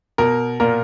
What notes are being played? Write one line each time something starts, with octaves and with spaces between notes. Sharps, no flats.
B2 A#4
A#2 A#4